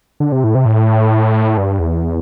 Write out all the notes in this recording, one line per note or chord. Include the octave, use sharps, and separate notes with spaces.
D3
C3
A2
C3
A2
G2
E2